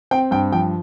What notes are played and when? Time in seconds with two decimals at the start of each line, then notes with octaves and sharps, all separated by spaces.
0.11 C4 G5
0.31 G2 G5
0.52 F3 G5